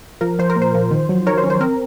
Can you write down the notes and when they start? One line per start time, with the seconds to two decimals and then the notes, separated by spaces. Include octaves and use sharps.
0.21 F3 A#4
0.39 F3 C5
0.50 A#4
0.56 A#2
0.62 C5
0.74 F3
0.91 D#3
1.09 F#3
1.26 D#3 A#4 C#5
1.38 C5
1.44 C#4
1.50 C5
1.61 C4 A#4